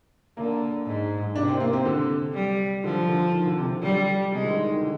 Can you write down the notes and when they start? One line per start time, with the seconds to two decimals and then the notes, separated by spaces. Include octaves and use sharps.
0.37 D3 A#3
0.86 G#2
1.36 C3 D4
1.48 C4
1.60 A#3
1.73 C4
1.85 D3
2.34 G3
2.84 D3 F3
3.08 D3
3.33 D#3
3.46 D3
3.58 C3
3.70 D3
3.82 D3 G3
4.32 C3 G#3
4.44 D3
4.57 D#3
4.69 D#3
4.81 D3